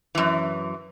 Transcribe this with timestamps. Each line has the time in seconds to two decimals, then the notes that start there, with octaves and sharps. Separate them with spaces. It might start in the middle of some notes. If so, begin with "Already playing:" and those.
0.15 F#2 E3